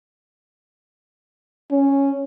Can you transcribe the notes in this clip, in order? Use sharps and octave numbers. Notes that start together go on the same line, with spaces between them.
C#4